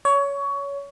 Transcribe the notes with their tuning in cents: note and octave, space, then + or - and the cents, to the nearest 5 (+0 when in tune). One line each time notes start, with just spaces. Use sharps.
C#5 +20